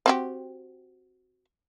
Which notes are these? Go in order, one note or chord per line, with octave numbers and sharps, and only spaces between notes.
C4 F#4 G4